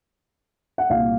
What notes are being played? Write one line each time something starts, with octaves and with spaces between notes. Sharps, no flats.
F#5
C2 A#2 G3 F5